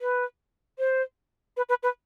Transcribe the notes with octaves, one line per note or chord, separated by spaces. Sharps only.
B4
C5
B4
B4
B4